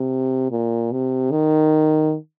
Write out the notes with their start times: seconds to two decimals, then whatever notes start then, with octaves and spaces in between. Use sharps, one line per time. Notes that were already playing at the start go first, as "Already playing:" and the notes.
Already playing: C3
0.51 A#2
0.92 C3
1.31 D#3